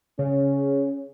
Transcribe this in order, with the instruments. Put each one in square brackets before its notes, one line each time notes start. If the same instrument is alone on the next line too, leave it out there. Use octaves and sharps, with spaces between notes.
[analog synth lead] C#3 [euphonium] C#4